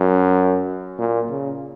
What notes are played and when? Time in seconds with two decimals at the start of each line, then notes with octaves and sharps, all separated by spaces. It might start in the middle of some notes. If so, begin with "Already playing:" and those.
Already playing: F#2
0.99 A#2
1.30 C#3